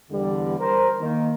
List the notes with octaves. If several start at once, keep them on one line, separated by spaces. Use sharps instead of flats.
E2 D3 G3
A#4 C5
D#3 A#3